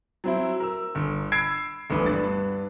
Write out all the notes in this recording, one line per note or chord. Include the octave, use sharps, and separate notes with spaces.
F#3 C4 E4
A#4 E6
G1
B5 E6 G#6 C7 D7
G1 D2 G2 E3 B4
G2 B3 D4 A6